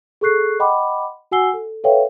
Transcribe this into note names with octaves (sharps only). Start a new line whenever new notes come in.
G#4 A4 C#6 F#6 C7
D#5 F#5 G5 B5 C6 D6
F#4 F#5 G#5 E6 C7 G7
A4
A4 B4 C#5 E5 F5 G5